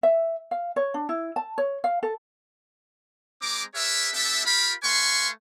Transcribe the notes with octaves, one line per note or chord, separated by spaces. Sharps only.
E5
F5
C#5
D4
E4
A5
C#5
F5
A4
G#3 C4 A#5 D6
G4 A#4 B4 C#5 E5
B3 D4 G4 A4 E5
F4 G4 A#4 F5 B5
A3 B4 F5 G#5 C6 C#6